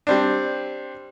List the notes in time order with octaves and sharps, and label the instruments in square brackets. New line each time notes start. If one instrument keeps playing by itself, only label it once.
[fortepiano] G3 C4 D4